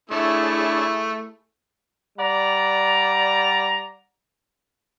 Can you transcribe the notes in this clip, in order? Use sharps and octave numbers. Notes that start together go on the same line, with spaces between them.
A3 D4 E4 G#4 C#5 E6
G3 D5 F#5 A#5